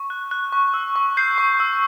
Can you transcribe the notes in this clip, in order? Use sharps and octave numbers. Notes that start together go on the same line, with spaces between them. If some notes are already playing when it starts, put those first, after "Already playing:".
Already playing: C#6
F#6
F#6
C#6
E6
C#6
G6 C7
C#6
E6